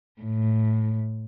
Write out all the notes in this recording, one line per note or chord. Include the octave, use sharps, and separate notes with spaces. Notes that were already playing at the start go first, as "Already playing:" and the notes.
A2